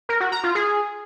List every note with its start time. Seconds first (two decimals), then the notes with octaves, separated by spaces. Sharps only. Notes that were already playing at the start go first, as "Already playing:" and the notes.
0.09 A#4
0.21 F#4
0.32 A#5
0.44 F4
0.55 G#4